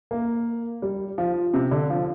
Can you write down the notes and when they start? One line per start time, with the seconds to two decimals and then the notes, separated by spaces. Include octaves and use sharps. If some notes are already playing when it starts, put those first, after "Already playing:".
0.11 A#3
0.82 G3
1.18 F3
1.53 C3
1.71 D3
1.90 F3